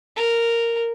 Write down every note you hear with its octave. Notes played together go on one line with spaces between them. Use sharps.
A#4